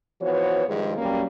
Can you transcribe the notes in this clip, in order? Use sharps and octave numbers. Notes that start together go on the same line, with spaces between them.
E3 F3 B3 F#4 C5 C#5
G2 D#3 F3 G#3
B2 F#3 G3 A#3 C#4